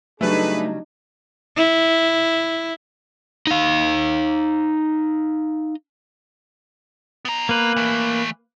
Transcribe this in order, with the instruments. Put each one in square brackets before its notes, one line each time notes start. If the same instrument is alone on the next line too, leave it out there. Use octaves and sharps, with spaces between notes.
[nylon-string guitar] C#3 F#3 G3 [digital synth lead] A3 [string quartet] D4 D#4 [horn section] G#4 B4
[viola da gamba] E4
[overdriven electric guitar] D#4 F5
[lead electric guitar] B3 A#5
[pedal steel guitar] A#3 B4
[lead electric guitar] E3 A3